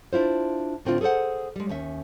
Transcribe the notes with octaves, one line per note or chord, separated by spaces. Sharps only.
D4 E4 F4 C5
A2 D3 C4 D4 D#4 F4
G#4 A4 B4 C5 F#5
G3 G#3
D#2 C#4 E5